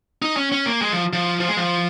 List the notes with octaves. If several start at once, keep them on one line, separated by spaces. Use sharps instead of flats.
D#4
C#4
C#4
A#3
G#3
F3
F3
F3
G#3
F3